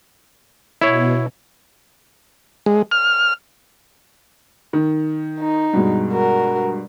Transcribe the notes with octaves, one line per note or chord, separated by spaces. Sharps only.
B2 E4 C#5
G#3
F6
D#3
D#4
G2 B2 G#3
F#4 A#4